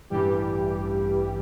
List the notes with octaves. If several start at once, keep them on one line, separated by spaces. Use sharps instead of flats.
A1 G2 E3 G3 G4